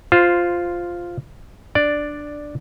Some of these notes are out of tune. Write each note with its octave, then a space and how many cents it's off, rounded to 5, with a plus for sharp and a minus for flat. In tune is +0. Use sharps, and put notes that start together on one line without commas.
F4 +0 C5 -5
D4 +5 D5 +0